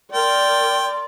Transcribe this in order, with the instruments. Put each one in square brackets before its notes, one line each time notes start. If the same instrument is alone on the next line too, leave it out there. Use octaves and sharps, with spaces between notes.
[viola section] A#4 D5 [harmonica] G5 [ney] C6